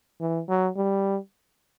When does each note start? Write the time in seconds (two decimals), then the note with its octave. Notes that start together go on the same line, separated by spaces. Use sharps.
0.21 E3
0.49 F#3
0.77 G3